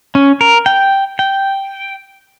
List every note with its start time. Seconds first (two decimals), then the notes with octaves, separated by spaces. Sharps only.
0.15 C#4
0.41 A#4
0.66 G5
1.19 G5